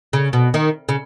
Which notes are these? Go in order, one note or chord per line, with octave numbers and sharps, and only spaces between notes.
C#3
B2
D#3
C#3